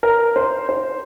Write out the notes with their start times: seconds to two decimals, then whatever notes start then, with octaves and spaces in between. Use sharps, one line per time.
0.03 A#4
0.36 C5
0.69 C5